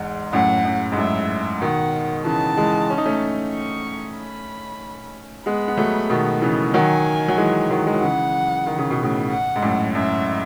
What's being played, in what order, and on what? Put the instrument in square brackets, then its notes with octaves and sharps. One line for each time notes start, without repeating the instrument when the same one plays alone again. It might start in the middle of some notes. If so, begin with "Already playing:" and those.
Already playing: [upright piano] E2 G#2
[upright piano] F#2 A2 [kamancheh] F#5
[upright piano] F#2
G#2
[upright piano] F#2 A2 [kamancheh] E5
[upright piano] B2 D#3 [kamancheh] F#5
[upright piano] C#3 E3 [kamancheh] A5
[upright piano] E3 G#3
C#4
D#4
A3 C#4
[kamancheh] C#6
B5
[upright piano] G#3 B3 [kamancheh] B5
[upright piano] B3
F#3 A3
B2 D#3
C#3 E3
[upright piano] D#3 F#3 [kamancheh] G#5
[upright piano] F#3
E3 G#3
D#3 F#3
G#3
F#3
[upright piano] C#3 E3 [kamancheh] F#5
[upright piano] D#3
C#3
B2
A2 C#3
[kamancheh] F#5
[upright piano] G#2
F#2 A2
[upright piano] F#2 [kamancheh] E5